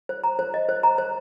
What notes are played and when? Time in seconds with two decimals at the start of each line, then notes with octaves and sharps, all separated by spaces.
0.09 C5
0.24 A#5
0.39 C5
0.54 D#5
0.69 C5
0.83 A#5
0.98 C5